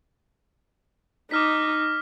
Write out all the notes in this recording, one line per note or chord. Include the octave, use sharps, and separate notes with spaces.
D#4 D6 F6 B6